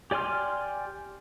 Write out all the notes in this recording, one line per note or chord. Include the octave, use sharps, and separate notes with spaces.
G4 D5 G#5 C6 F6